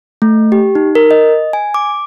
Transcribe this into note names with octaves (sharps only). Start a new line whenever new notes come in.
A3
G4
D#4
A#4
D#5
G#5
D6